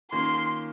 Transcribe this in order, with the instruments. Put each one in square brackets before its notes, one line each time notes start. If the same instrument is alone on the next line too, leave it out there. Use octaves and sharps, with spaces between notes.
[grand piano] D#3 A#3 C#4 F4 [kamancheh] C6